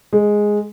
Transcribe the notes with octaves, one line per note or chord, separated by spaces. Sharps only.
G#3